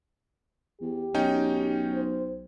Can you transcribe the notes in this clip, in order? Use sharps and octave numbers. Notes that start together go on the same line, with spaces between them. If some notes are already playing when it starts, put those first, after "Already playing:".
E2 G4
B1 C#4 D#4 G5
C5